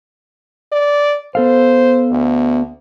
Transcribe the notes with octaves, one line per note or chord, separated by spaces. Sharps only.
D5
B3 A4 C5 F5
D2